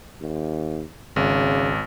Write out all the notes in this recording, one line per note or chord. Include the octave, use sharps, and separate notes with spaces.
D#2
G#1 C#3